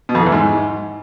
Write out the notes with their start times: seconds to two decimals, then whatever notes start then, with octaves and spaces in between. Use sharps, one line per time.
0.09 B2
0.15 F2
0.21 E3
0.26 E2
0.32 G#2